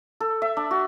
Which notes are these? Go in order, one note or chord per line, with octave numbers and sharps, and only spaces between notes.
A4
E5
D4
F#4